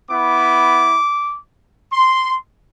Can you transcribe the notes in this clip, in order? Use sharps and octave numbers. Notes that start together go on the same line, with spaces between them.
B3 E4 D6
C6